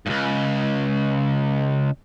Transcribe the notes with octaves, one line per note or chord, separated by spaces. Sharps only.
C#2 G2